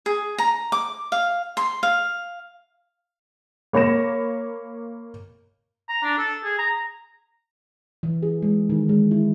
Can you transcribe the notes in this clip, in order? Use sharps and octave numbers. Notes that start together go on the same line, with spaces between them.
G#4
A#5
D6
F5
C6
F5
A#3 C#5 B5 A#6 E7
A#5
D4
A4
G#4
A#5
E3
G#4
G#3
D#3
G#3
E4